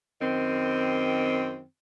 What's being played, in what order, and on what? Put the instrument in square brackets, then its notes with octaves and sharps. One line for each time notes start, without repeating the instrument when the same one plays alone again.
[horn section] F#2 D#3 C4